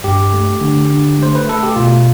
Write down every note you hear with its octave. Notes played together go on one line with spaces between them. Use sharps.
G2 G4
A3
D3
D3
A3 C5
B4
A3 A4
G4
B2 F4